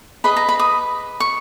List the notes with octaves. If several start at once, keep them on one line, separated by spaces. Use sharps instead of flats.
G#4 B4 D#5 B5
A#5
B5
D#6
C#6